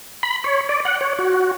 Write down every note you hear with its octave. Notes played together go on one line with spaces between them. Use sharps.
B5
C#5
D5
F#5
C#5
F#4